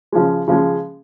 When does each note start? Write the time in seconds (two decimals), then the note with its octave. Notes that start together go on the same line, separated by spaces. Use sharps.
0.12 C#3 F3 G#3
0.48 C#3 F3 G#3